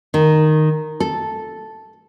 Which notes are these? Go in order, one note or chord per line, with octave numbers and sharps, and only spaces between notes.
D#3
A4